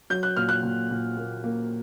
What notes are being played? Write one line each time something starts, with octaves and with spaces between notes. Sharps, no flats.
F#3 G6
F#6
A#2 F6
F#6
A#2
A#2
A#3
A#3